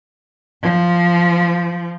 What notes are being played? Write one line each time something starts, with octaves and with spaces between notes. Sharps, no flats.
F3